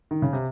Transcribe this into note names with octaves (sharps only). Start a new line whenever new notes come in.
D#3
C#3
C3